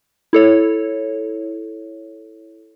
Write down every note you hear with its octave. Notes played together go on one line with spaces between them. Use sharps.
E4 A4 C#5